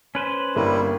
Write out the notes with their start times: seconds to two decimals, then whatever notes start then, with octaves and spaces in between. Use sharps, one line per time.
0.15 C#4 B4 C5
0.56 G1 G3 A#3 E4